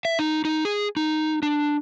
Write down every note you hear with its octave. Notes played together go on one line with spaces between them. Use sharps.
E5
D#4
D#4
G#4
D#4
D4